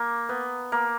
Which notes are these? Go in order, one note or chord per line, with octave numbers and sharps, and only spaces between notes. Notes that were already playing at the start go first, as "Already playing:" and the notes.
Already playing: A#3
B3
A#3